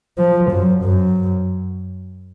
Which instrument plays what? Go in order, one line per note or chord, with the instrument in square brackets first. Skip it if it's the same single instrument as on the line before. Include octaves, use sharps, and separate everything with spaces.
[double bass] F3
F#2
F#2